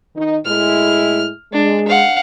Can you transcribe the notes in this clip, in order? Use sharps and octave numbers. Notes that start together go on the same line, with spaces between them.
D#3 D#4
A2 G#3 E4 F6
G#3 D4
F5 F#5